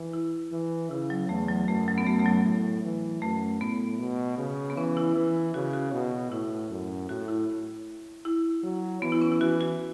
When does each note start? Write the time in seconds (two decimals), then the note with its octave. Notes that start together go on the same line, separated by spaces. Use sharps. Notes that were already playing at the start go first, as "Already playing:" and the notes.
Already playing: E3
0.13 E4
0.52 E3
0.90 C#3 E4
1.10 F#3
1.29 E2 A3
1.48 F#3
1.68 F#2 A3
1.88 F#3
1.98 B3
2.06 F#2 A3
2.19 A3
2.26 F#3
2.45 A2
2.84 E3
3.22 F#2 A3
3.61 A2 B3
3.99 B2
4.38 C#3
4.70 B3
4.77 E3 C#4
4.97 E4
5.15 E3 E4
5.54 C#3 F#4
5.73 F#4
5.92 B2
6.31 A2 E4
6.70 F#2
7.09 A2 F#4
7.28 E4
8.25 E4
8.63 F#3
9.02 E3 B3
9.12 E4
9.22 C#4
9.32 E4
9.41 E3 F#4
9.61 F#4